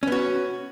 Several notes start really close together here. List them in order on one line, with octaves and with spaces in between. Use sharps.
C#4 B3 F#4